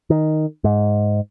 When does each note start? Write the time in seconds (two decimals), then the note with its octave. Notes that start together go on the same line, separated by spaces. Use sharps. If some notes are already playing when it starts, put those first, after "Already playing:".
0.10 D#3
0.64 G#2